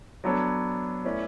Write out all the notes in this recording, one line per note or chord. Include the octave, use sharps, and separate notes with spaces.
F#3 B3 D4 A4 C#5
A3 C#4 E4 B4 D5